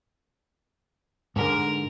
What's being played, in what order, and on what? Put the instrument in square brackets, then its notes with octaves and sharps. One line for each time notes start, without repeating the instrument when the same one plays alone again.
[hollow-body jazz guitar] G#2 D3 G#3 [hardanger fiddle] A#4